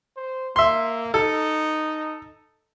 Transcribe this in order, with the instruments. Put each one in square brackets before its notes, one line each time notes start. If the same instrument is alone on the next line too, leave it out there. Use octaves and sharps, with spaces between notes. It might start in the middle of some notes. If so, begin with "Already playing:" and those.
[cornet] C5
[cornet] A#3 [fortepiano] E5 C6
[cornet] D#4 [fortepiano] A4